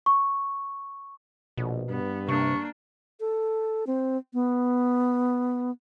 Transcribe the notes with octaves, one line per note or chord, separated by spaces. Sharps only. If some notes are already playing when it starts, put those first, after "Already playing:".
C#6
A#1 B2
G2 B3
C3 A#3 D4 C#6
A4
C4
B3